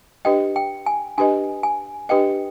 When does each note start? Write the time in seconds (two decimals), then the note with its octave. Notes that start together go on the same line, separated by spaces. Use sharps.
0.25 D4 G4 B4 D#5 G5
0.56 G5
0.86 G#5
1.18 D4 G4 B4 D#5 G#5
1.63 G#5
2.09 D4 G4 B4 D#5 G5